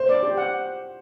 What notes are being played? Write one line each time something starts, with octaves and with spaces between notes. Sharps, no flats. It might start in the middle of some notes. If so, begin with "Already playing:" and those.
Already playing: C5
D5
G4
F#5